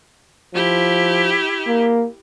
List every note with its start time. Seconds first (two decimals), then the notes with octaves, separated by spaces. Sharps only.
0.55 F3 E4 G4
1.67 A#3